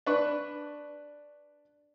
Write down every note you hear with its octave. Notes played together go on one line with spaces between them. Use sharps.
D4 B4 C#6